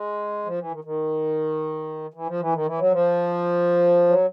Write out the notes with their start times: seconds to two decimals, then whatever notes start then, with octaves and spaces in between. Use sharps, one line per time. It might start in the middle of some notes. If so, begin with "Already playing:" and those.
Already playing: G#3
0.45 F3
0.59 E3
0.72 D#3
0.84 D#3
2.14 E3
2.27 F3
2.40 E3
2.53 D#3
2.66 E3
2.79 F#3
2.92 F3
4.08 F#3